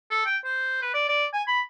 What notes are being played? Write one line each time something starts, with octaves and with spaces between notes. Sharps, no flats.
A4
G5
C5
B4
D5
D5
G#5
B5